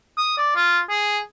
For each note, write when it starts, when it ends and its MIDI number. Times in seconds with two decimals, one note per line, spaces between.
0.17 0.35 87
0.38 0.55 74
0.56 0.79 65
0.90 1.18 68